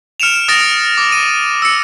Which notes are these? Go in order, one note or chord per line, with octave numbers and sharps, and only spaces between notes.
F6 C#7 D7 E7 F7
D#6 F6 A6 A#6 D7
D6
D#7
E6 C#7